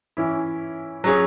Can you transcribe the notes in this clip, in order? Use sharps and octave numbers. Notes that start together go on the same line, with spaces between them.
E3 C#4 E4
F#3 C#4 G#4 C#5